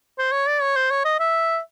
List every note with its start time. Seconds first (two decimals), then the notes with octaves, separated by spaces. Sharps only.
0.18 C5
0.32 C#5
0.47 D5
0.61 C#5
0.76 C5
0.90 C#5
1.04 D#5
1.19 E5